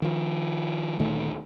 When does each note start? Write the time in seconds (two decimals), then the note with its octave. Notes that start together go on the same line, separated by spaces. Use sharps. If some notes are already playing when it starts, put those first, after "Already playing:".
0.02 D#3 F3
0.99 D2 A#2 D#3 A3